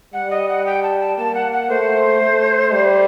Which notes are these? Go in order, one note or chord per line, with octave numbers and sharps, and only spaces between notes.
G3 F#5
D#5
F#5
G5
A5
A5
A#3 A5
F#5
F#5
A3 C5
A3
G3